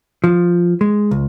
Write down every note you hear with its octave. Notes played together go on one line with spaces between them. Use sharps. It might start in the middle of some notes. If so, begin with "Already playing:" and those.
F3
G#3
C#2